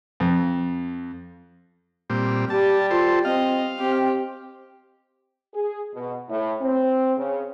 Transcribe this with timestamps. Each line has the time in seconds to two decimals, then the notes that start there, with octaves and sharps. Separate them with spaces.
0.20 F2
2.10 A#2 G3 C4
2.50 G3 G4 A5
2.90 F4 A4 C5
3.25 C4 D#5 F5
3.79 C4 G4
5.54 G#4
5.94 B2
6.29 A2
6.61 C4
7.17 C#3